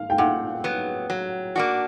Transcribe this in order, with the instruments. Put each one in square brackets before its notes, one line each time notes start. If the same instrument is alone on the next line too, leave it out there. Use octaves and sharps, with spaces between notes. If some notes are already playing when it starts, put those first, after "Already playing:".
Already playing: [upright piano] F5
G5
[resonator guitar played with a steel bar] A#2 [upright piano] F#5
[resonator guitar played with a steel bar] F#3 B3
F#3
A#3 D4 F#4